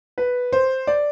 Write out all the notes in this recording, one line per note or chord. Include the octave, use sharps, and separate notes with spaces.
B4
C5
D5